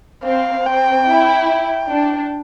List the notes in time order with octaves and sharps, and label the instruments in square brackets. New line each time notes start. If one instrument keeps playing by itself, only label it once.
[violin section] C4 [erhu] F5
[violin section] C4 [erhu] G5
[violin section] E4
[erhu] G5
[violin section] D4